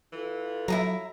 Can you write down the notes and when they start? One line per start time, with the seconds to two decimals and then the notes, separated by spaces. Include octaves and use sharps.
0.13 E3 F4 A4
0.68 F#3 E4 G#4 A#5